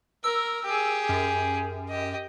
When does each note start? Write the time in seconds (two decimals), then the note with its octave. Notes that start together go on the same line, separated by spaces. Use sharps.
0.24 A#4 E6
0.65 G4 G#4
1.09 F#2
1.89 G4 D#5